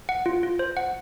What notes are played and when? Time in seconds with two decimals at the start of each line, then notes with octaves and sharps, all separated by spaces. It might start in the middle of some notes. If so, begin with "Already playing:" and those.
0.09 F#5
0.26 F4
0.43 F4
0.59 C5
0.77 F#5